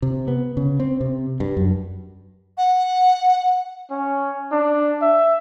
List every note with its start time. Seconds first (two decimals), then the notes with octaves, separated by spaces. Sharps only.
0.02 C3
0.28 B3
0.57 C#3
0.80 C4
1.00 C3
1.40 G2
1.57 F#2
2.58 F#5
3.91 C#4
4.51 D4
5.02 E5